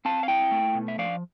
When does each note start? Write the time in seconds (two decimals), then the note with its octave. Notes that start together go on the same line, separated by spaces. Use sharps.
0.05 C4 F5 A5
0.23 F5
0.28 E4 E5 G5
0.51 A3
0.75 B2
0.88 E5
0.98 F3 D5 F5